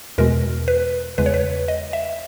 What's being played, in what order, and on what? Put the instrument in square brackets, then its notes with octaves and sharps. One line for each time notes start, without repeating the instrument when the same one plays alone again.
[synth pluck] E2 B2 G#3 A#4
B4
E2 C#3 G#3 B4
C#5
B4
D#5
E5